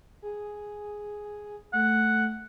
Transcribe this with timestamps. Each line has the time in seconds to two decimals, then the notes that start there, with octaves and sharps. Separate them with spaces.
0.22 G#4
1.73 A3 F#5